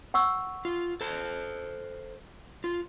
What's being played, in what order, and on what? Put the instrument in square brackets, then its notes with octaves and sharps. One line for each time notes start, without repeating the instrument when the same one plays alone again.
[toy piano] F#5 C#6 E6
[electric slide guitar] F4
A4 C5
F4